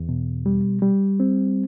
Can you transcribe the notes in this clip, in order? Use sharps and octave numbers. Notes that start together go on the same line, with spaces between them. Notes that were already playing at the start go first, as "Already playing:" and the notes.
Already playing: E2
B2
G3
G3
C4